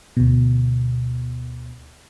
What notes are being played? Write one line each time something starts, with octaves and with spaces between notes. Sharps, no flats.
D2 B2